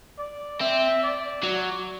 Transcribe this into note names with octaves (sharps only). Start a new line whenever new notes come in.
D5
C4 E5
D5
F#3 D5